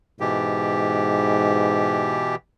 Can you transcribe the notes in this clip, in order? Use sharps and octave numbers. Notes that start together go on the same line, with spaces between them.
G#2 B2 E3 G4